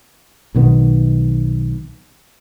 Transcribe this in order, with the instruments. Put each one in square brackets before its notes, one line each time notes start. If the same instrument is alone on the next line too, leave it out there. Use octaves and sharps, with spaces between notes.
[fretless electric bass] B1 B2 D#3 B3